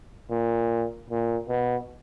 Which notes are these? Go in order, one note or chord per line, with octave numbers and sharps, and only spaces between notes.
A#2
A#2
B2